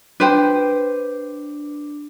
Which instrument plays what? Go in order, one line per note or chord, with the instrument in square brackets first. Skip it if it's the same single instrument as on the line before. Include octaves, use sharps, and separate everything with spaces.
[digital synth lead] D4 [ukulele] B4 C5 G5